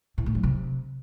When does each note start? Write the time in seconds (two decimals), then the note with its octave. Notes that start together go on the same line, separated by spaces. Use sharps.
0.18 A2
0.26 A3
0.35 F#3
0.43 C3